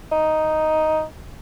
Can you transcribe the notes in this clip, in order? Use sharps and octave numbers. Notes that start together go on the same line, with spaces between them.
D#4